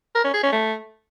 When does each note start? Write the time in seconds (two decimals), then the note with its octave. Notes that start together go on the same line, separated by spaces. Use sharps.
0.15 A#4
0.24 C#4
0.34 G#4
0.43 C#4
0.52 A3